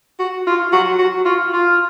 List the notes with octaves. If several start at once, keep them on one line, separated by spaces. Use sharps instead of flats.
F#4
F4
F#4
F#4
F4
F4